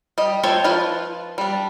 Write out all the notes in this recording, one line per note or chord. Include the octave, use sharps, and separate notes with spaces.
G3 D#5
F4 A4 C5 C#5 G5
F3 F4 B4 F5
G3 D4